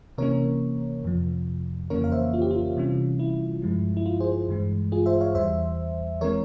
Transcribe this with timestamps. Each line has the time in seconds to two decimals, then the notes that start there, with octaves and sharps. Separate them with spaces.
0.18 C3 E3 A#3 C#4 A#4 C#5
1.04 F2 C3 F3
1.90 F2 C#3 E3 A#3 C#4 A#4 C#5
2.04 F5
2.12 C5 E5
2.34 F4
2.42 G4
2.51 F4
2.77 C3 E3 G3 C#4
3.19 E4
3.62 G2 F3 G#3
3.97 E4
4.06 F4
4.20 G#4 C5
4.49 G2 E3 G#3
4.92 F4 G#4
5.06 C5 E5
5.21 C#5 F5
5.35 E2 E3 G3 C5 E5
6.21 E3 G#3 C4 A#4 C#5